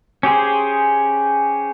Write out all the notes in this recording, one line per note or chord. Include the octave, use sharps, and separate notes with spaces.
C#4 G4 G#4 C5